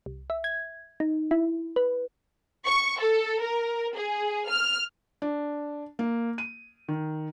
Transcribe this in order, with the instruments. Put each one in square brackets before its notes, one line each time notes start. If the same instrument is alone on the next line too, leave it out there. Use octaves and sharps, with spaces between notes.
[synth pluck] C2
E5
G#6
D#4
E4
B4
[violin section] C#6
A4
A#4
G#4
F6
[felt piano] D4
A#3
D#7
D#3